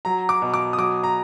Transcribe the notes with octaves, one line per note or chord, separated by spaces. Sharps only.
F#3 A#5
D6
B2
D6
D#6
F#3 D6
A#5